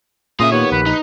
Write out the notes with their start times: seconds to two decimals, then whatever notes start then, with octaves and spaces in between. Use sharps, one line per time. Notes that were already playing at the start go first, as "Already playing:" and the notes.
0.40 A#2 C#3 F4 E5 D#6
0.52 D#2 B3 C#5
0.72 A#1 B4
0.86 D#4